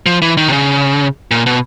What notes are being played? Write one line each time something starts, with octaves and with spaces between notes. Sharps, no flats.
F3
E3
D#3
C3
C#3
A#2
B2